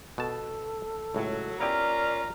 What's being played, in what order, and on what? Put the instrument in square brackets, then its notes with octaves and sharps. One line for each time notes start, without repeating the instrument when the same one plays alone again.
[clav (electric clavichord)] B2 A5 [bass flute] A4
[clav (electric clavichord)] C#2 A2 [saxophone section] F#3
[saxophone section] A#3 C#4 F4 [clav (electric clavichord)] B3 E4 G4 [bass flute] D5 [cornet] A#5